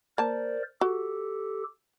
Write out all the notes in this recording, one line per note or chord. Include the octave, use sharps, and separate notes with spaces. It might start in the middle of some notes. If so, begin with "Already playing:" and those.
A#3 A#4 C5 D5 A5
F#4 G4 A4